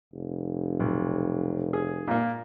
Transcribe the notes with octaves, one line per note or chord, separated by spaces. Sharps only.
F1
B1
G#4
A#2 A#3